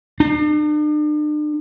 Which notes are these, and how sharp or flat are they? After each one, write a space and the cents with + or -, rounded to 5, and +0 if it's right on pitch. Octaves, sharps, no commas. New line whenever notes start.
D4 +40